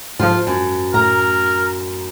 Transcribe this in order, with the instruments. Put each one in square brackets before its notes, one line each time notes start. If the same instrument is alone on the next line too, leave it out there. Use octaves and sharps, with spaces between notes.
[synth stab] G#2 F3 [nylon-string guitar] F4 G4 A4
[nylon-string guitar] F#2
[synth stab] A2 A#5 [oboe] A#4